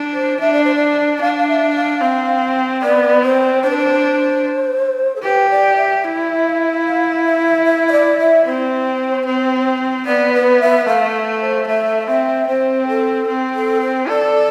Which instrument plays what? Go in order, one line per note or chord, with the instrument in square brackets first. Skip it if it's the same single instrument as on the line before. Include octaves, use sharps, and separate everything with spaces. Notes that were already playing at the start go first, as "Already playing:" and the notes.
Already playing: [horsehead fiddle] D4
[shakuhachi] C5
[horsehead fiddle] D4 [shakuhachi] E5
[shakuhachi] D5
C5
D5
[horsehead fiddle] D4 [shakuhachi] F5
[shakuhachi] F5
E5
E5
F5
[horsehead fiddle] C4 [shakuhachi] F5
[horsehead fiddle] B3 [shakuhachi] D5
[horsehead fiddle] C4 [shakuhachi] C5
[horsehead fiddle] D4 [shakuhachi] C5
[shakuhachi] B4
C5
A4
[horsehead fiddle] G4 [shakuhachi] B4
[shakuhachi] D5
E5
[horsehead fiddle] E4
[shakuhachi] F5
E5
E5
E5
D5
E5
[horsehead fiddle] C4 [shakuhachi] C5
[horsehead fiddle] C4
[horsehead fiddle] B3 [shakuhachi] D5
[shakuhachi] B4
E5
[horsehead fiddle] A3 [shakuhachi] F5
[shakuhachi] C5
[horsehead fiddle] A3 [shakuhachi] E5
[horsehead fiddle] C4 [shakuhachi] E5
[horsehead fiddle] C4 [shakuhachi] C5
[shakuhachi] A4
[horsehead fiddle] C4
[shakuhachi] A4
C5
[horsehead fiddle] A4 [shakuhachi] D5